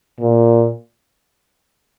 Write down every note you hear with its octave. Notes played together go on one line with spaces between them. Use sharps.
A#2